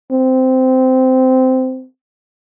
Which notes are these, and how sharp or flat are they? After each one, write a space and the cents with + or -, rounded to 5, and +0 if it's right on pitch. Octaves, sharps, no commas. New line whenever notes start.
C4 -15